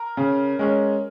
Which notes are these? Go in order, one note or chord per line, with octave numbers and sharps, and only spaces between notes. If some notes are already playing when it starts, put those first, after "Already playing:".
Already playing: A#4
C#3
G#3 C#4